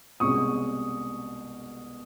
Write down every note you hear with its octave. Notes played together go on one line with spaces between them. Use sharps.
C2 B2 G#3 C#4 C#6 D#6